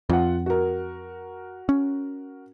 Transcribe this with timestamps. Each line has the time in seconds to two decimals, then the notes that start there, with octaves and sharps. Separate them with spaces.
0.10 F2 F4 F#5
0.46 F#4 A#4
1.69 C#4